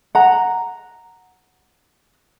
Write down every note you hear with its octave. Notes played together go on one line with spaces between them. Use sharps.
F#5 A#5